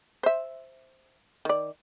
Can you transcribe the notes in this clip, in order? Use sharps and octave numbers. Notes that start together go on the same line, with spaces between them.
C5 E5
D#3 D5